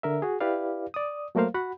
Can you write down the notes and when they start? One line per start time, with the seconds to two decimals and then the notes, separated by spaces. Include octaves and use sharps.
0.03 D3 A#4 E5
0.22 F#4 G#4
0.41 E4 G4 B4 D5 F5
0.94 D5 D#6
1.35 F#3 A3 A#3 A#4 C5 F5
1.54 F#4 F#5 B5